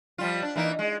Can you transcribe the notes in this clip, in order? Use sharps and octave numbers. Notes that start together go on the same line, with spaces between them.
F3 G3 F4
D4
E3 A#3 D#4
G#3